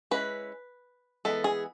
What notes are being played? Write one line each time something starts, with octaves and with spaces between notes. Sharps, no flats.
G#3 C#4 E4 B4
E3 G#3 B3 E4 A4
G#4